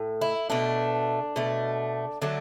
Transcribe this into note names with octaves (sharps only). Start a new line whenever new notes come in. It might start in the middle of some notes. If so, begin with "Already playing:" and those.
Already playing: A2
E4
B2 A3 D4
B2 A3
D3 F#3 A3 D4